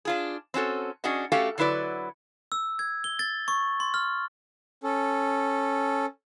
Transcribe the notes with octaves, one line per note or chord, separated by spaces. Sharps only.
D4 F4 G#4
C4 C#4 F#4 A4
C#4 D4 F#4 G#4 D#5
A3 C#4 F#4 G4 A4 F5
D3 F#3 E4 B4 D5
E6
G#6
G7
A6
C#6
C6
F6
C#4 A4